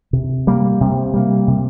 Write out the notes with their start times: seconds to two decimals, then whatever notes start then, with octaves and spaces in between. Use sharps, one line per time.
0.13 C3
0.47 G3 A#3
0.81 C3
1.14 G3 A#3
1.48 C3